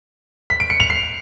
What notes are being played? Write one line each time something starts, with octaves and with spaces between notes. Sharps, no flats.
B6
D7
C#7
F7
C7